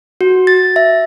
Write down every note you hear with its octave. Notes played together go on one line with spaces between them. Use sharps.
F#4
A6
E5